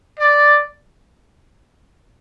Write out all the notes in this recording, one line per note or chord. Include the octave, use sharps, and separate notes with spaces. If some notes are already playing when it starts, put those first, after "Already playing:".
D5